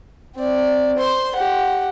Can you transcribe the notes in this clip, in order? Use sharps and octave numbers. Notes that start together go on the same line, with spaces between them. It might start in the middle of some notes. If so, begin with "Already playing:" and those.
C4 D5
C5 C6
G4 F#5